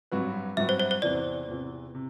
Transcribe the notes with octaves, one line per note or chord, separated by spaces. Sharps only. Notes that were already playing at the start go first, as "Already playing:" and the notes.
G2 F#3 C4 F#4 B4
G2 F#3 C4 F#4 B4 E5
C5
C5
C5
E2 C3 E3 D5
E2 C3 E3
C3